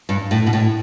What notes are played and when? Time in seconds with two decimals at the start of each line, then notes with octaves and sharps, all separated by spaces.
0.09 G2
0.31 A2
0.47 B2
0.53 A2